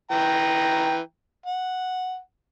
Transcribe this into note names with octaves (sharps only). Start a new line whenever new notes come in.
E3 G5 A#5
F#5